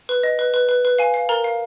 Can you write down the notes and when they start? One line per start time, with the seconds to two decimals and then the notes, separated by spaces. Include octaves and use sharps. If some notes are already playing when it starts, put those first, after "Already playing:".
0.09 B4
0.23 D#5
0.39 B4
0.54 B4
0.69 B4
0.85 B4
0.99 F5 G#5
1.14 F5
1.29 A#4 A#5
1.44 F5